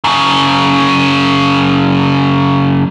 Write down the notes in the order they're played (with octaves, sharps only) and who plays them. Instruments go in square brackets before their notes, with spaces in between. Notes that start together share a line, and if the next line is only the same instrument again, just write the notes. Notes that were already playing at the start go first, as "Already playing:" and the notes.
[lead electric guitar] F#2 C#3